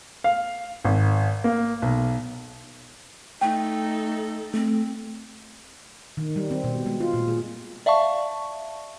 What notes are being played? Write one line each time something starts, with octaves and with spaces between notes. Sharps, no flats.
F5
G#1
A#3
B1
A3 D#4 A4 G5
A3 C4
D#3
G3
C4
B2
G#3
F4
A#2
G#4
D5 E5 F5 A5 C#6